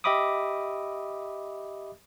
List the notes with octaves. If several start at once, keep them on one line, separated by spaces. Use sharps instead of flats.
G4 D#5 E5 B5 D6 D#6